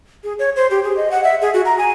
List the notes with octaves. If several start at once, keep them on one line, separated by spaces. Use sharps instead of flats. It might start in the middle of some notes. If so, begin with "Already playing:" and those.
G#4
C#5
C5
G4
G#4
D#5
F#5
E5
G#4
F#4
A#5
G#5